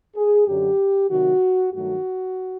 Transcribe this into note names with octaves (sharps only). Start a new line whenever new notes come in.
G#4
F#2 D3 F#3 G4
C3 D#3 F#3 F#4
G2 D#3 F#3 A3 F#4